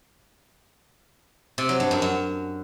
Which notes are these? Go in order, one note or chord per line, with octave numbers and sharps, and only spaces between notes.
C3
F#3
G2
F#2
F#2